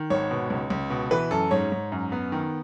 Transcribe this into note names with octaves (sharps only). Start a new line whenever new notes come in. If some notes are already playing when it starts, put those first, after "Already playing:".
Already playing: D#3
G#1 C#5
B2
C#2
C#2
B2
E3 B4
F#2 A4
G#2 C#5
G#2
F#2
B3
D#3